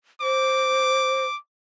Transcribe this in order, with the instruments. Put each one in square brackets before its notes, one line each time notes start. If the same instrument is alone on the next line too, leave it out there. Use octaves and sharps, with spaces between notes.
[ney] C5 [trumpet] D6